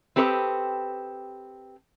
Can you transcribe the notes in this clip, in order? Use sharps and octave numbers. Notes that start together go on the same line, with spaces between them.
C4 G4 A4 B4 C5 D#5